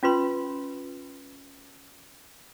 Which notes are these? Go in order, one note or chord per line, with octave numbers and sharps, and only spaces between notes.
C#4 F4 B4 C6